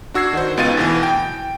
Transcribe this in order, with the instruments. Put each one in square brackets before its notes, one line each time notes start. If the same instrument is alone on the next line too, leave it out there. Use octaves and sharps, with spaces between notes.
[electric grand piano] D4 F#4 E6 G#6 C7
D#3 F#4 C5
C#2 B3 D#4 F4 A6 D#7
D2 B2 E3
G5